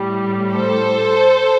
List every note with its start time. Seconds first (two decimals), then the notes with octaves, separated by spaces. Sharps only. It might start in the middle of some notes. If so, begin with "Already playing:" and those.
Already playing: A2 G3
0.54 A4 C5